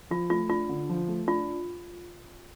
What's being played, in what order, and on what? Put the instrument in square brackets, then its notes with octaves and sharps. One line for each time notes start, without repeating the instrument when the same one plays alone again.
[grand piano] F3 [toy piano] F4
[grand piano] A3 [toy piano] F4
[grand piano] D4 [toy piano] F4
[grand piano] D3
F3
A3
[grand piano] D4 [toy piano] F4